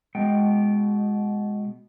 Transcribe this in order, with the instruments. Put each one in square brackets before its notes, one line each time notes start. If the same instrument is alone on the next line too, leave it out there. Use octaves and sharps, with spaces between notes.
[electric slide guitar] B2 G#3 G5